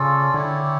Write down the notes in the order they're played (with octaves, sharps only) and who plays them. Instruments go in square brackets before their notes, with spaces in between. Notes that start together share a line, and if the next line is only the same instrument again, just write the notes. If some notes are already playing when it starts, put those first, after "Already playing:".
Already playing: [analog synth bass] C#3 [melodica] C#4 F4 A4 D5
[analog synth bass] D3 [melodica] E4 G4 C#5